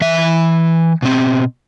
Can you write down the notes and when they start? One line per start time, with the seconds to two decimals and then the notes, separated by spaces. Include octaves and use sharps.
0.01 E3 E5
1.02 B2 C4